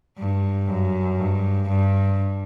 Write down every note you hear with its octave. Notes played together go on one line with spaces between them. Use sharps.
G2
F#2
G2
G2